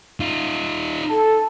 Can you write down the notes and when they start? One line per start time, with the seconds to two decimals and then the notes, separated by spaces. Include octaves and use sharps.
0.20 D#4 F4
1.10 A4 A5